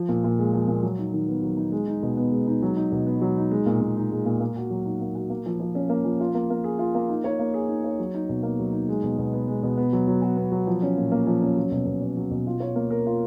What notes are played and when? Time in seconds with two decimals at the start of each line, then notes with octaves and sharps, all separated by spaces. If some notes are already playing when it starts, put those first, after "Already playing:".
Already playing: F3
0.09 A#2
0.24 A#2
0.39 G#3
0.53 F3
0.68 A#2
0.83 F#3
0.98 D#4
1.13 D#3
1.28 B3
1.42 F#3
1.57 D#4
1.72 G#3
1.87 D#4
2.03 B2
2.17 B3
2.32 G#3
2.47 D#4
2.62 F#3
2.77 D#4
2.92 B2
3.06 B3
3.21 F#3
3.37 D#4
3.51 G#3
3.66 A#2
3.81 A#2
3.97 D#4
4.12 G#3
4.26 A#2
4.40 A#3
4.56 F#4
4.70 F#3
4.85 D#4
5.01 A#3
5.15 F#4
5.30 A#3
5.46 F3
5.60 F3
5.75 C#4
5.89 A#3
6.05 F3
6.20 F4
6.35 A#3
6.50 A#3
6.64 G#4
6.79 F4
6.95 A#3
7.09 D#4
7.24 C#5
7.39 A#3
7.54 G#4
7.69 D#4
7.84 C#5
7.99 F#3
8.14 D#4
8.29 B2
8.43 A#3
8.59 F#3
8.73 D#4
8.89 G#3
9.03 B2
9.18 B2
9.33 B3
9.48 G#3
9.63 B2
9.77 B3
9.93 F#3
10.07 F#3
10.22 F#4
10.37 B3
10.52 F#3
10.67 F3
10.82 C#4
10.97 A#2
11.11 A#3
11.27 F3
11.42 C#4
11.57 F#3
11.71 B2
11.86 B2
12.02 C#4
12.17 F#3
12.31 B2
12.47 F4
12.60 C#5
12.76 A#3
12.90 A#4
13.06 F4